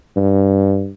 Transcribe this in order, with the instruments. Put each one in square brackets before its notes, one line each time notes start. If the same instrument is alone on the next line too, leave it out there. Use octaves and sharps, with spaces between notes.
[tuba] G2